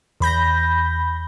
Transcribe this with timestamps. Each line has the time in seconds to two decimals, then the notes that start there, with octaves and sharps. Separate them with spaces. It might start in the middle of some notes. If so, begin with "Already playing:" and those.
0.20 E2 B5 G6 A#6